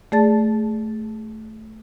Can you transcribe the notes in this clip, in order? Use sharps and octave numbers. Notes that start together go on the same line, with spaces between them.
A3 G#4 D5 A5 A6